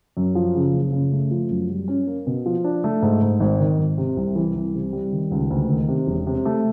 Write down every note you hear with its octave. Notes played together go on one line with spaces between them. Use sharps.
F#2
F3
C#3
F#1
C#3
A3
F3
F#2
G3
C#4
A#3
B2
F3
D4
A3
G#2
G#2
G#1
D#3
G#1
C3
C2
E3
C2
C3
G3
D#3
C#2
D2
D#3
C3
E1
C3
A3